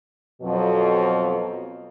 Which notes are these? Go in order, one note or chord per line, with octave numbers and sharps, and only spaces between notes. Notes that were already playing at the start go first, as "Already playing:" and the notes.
F2 B2 F#3